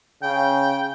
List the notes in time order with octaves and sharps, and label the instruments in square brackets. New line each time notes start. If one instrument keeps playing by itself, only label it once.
[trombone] C#3 [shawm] G5